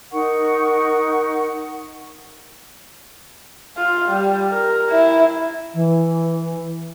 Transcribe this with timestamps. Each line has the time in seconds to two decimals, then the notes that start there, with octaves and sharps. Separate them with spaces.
0.11 D#4 A#4 F#5 C#6
3.77 F4
4.09 G3
4.52 A#4
4.90 E4
5.74 E3